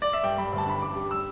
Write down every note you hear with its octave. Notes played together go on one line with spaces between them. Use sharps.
D5
E5
G2 G5
G2 B5
D2
A5
D4 B5
A1 D6
G3
E6